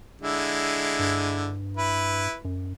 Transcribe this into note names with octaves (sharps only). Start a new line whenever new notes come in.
D3 G#3 E4
G2
E4 B4
F#2